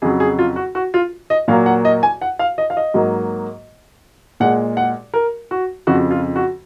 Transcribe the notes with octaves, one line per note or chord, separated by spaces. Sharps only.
F2 C#3 F#3 G#4
G#4
F4
F#4
F#4
F4
D#5
A#2 F#3 A#3 F5
F#5
D#5
G#5
F#5
F5
D#5
F5
D#5
G#2 F#3 A#3
A#2 G#3 F#5
F#5
A#4
F#4
F2 C#3 F3 F#4
F4
F#4